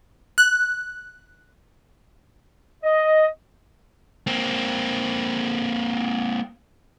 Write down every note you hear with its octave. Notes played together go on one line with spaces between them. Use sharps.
F#6
D#5
A#3 C4